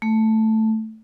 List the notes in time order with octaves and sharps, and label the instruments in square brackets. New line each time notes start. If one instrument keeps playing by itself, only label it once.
[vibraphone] A3